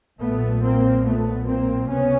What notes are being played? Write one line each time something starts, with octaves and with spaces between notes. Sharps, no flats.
B1 A#2 A3 B3
A#3 C4
A3 B3
A#3 C4
C#2 C3 B3 C#4